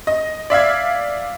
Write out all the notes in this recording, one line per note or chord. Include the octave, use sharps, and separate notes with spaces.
D#5
D5 E5 F5 G#6